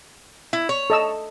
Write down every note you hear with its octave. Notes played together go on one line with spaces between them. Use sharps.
E4
C#5
A4 D#5 E6